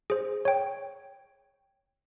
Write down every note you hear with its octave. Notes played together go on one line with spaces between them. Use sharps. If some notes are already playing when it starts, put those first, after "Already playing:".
G#4 C5
C#5 G5